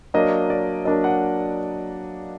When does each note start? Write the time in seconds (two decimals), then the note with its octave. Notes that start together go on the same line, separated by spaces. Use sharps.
0.14 F#3 A#3 D4 D#5
0.50 D5
0.85 F#3 A#3 D4 D#5
1.04 F#5